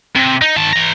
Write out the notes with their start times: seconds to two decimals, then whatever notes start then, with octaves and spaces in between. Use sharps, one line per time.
0.16 C3
0.42 D#4
0.57 D#3 A5
0.73 E3 A#5